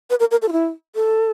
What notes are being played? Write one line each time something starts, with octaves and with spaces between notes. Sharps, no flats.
B4
A#4
A#4
A4
F4
E4
A4